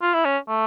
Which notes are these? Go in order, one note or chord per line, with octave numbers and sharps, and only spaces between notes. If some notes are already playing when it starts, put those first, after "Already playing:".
F4
E4
C#4
A3